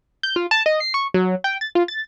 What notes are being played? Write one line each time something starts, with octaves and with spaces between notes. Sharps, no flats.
G6
F4
A5
D#5
C7
C#6
F#3
G5
A6
F4
A6